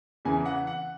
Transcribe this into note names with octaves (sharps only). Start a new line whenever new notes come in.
E2 C#3 E3 G#5
F#5
F#5